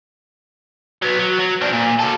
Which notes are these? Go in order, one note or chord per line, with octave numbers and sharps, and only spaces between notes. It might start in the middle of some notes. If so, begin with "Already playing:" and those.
F#3 B3
F#3
F#3
F3 D4
A#2
F#4 A4